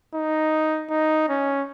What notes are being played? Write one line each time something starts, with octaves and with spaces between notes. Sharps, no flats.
D#4
D#4
C#4